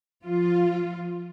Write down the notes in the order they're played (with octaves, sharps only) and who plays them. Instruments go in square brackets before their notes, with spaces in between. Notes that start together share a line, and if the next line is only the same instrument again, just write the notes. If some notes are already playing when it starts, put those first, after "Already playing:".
[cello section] F3 F4